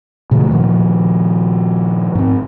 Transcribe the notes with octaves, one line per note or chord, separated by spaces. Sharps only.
A#2 C#3 E3 A3
A#2 D#3 F3
G#2 C4